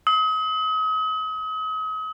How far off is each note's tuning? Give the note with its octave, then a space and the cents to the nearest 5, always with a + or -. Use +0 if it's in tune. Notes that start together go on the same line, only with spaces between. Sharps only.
D#6 +40